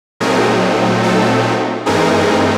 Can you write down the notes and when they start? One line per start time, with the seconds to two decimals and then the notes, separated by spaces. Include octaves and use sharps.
0.20 A#2 F#3 A3 C4 D#4 G#4 A#4
1.03 A4
1.86 G2 E3 A3 C4 D#4 G#4 A#4